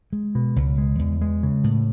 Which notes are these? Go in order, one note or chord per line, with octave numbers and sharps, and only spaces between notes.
G#3
B2
C#2
G#3
E2
G#3
C#3
A2